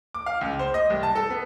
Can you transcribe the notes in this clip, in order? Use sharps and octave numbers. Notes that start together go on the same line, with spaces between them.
D6
F5
C#2
C5
D#5
C2
A5
A4
B3